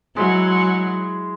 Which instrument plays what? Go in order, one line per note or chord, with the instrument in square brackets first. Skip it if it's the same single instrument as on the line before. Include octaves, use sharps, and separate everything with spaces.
[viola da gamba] F#3 [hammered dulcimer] G#3 E4